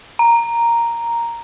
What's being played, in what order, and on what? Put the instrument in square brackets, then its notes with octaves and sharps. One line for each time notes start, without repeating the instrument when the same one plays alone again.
[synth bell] A#5